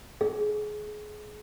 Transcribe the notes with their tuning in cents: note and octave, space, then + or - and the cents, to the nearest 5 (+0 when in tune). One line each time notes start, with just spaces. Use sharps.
G#4 +25